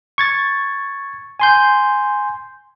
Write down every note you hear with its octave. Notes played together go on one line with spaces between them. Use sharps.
C#6 G#6 A6
G#5 C6 G6